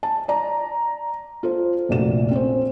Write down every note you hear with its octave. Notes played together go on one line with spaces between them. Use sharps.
A5
D5 A#5
F4 A4 C5
F1 A#1 A#2 A3 F#4 E7
C4 C#4 C5